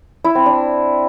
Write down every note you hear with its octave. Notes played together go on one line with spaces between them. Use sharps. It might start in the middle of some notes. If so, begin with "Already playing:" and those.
E4
C4
D4